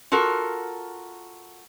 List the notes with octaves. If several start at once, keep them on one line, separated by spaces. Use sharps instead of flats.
F4 F#4 A4 A#4